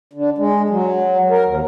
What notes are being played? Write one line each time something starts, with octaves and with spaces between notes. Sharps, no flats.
D3
G#3
F#3
A#4
D#2